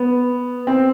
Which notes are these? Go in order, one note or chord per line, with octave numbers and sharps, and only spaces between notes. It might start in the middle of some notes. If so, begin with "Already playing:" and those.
Already playing: B3
C4